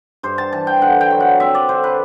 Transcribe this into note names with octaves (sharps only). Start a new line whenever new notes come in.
G2 C5
A5
E3 A5
G5
D3 F#5
G5
F#3
F#5
C4 E5
D5
D3 C5
B4